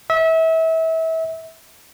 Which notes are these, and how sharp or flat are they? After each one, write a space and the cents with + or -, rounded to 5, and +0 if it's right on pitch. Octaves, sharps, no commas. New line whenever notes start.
E5 -30